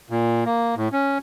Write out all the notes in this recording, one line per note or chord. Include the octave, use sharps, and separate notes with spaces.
A#2
A#3
A2
C#4